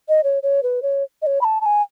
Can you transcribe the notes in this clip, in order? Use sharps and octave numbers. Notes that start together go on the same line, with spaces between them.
D#5
C#5
C#5
B4
C#5
D#5
C#5
B5
A5
A5
G#5